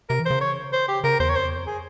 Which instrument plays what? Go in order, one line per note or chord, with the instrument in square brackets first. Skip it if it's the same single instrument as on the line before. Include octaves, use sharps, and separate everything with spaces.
[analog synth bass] C3 [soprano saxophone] A#4
[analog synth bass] E3
[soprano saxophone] C5
[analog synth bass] C#3
[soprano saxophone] C#5
C5
G4
[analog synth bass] C#3 [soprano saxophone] A#4
[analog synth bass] E2 [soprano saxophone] C5
[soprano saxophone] C#5
[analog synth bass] F2 [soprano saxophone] C5
[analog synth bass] E2
F2
[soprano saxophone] G#4